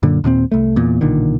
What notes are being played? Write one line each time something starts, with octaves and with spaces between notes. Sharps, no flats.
F#2 A#2 D3
D#2 A#2 B3 C4
C2 A3
E2 A#2
B1 A#2 D3 D#3